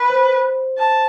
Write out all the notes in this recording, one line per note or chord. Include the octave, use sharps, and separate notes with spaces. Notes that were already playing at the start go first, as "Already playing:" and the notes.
Already playing: B4
C5
A5